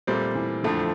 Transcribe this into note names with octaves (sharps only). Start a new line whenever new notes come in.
A#2 G3 A3 C4
E3
F2 D3 F3 A3